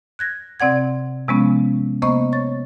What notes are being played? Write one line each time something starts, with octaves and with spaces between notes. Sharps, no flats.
F#6 G#6 A#6
C3 C4 D5 F#5 G#6
C3 F3 G#3 B3 C#4
C3 A#3 B3 C5 D#5 C#6
C#5 C#6 A6